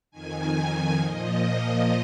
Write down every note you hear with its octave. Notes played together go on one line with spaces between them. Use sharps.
F2 D#3 G#5
A#2 F3 D#5